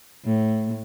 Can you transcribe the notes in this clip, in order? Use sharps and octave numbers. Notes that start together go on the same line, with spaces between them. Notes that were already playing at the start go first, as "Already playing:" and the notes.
A2